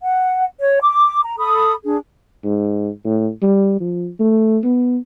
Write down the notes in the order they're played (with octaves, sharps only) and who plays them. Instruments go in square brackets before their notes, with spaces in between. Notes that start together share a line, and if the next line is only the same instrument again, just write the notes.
[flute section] F#5
C#5
D6
A#5
A4 B5 D#6
D4 G#4
[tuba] G#2
A2
G3
F3
A3
B3